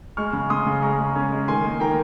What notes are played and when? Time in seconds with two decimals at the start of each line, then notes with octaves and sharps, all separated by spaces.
0.17 G#3 C#6 F6
0.33 C#3
0.50 C#3 C6 D#6
0.66 C#3
0.82 G#3 A#5 C#6
0.99 G#3
1.15 C#4
1.32 G#3
1.48 D#3 G#5 C6
1.64 A#3
1.80 D#3 G5 A#5